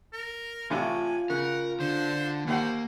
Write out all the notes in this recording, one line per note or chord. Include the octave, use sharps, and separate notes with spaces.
A#4
A1 A2 C3 F4 G#5
C#3 A#4 F#5
D3 C5
D#2 A#3 C5 F#5